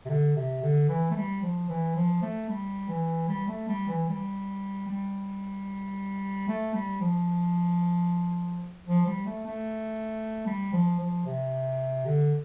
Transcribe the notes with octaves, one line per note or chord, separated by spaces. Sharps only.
C3
D3
C3
D3
E3
A3
G3
F3
E3
F3
A3
G3
E3
G3
A3
G3
E3
G3
G3
A3
G3
F3
F3
G3
A3
A3
G3
F3
F3
C3
D3